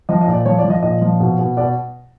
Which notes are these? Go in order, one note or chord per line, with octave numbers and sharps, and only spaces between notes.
F3 D#5
D#5
A#2
D5
F3 C#5
D5
F3
D#5
A#2 D#5
F3
B2
B2
B2 D5